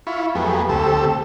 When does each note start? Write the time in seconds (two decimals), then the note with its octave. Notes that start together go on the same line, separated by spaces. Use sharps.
0.07 E4 F4 B5 C#6
0.35 F2 F#3 A3 B3 G4 G#4
0.69 D2 A3 C4 G4 A4 E6